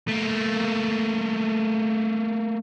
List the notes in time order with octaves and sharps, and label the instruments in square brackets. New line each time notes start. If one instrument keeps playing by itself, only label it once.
[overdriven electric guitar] A3 A#3